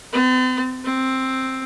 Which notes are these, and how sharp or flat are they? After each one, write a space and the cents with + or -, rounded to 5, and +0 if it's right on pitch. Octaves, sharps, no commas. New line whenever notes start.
C4 -45
C4 +5